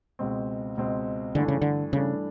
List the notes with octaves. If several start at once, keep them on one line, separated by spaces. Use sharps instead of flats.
C#2 B2 G#3 C4
C#2 B2 G#3 C4
G2 D3 E3 A3 D4
C#3
D3
G2 C#3 E3 A3 D4